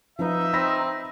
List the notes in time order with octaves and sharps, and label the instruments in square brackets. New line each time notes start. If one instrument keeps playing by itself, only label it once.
[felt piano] F3 B4 [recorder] D#4 [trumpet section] E5
[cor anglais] C4 [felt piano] B5 A#6 B6